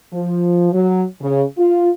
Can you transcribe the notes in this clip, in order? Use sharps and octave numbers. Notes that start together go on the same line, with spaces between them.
F3
F#3
C#3
F4